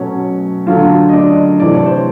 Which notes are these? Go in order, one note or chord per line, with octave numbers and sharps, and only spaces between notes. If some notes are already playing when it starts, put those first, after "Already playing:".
Already playing: B2 F#3 A3 C#4 C#5
D3 F#3 A3 F4 F5
D#5
D4 D5
C3 E3 A3 D5
C#5
C5